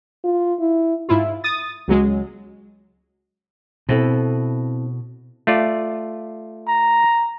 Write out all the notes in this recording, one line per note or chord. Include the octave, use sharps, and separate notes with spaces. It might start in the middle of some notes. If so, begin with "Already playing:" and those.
F4
E4
G#2 E4 F4
D#6 A6
C#2 F#3 G#3
B2 C4 E4 A4
A3 F4 D5
A#5